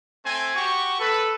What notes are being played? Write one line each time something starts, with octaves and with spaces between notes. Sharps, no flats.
A3 C4 G#5
F#4 G4 C#6
A4 B4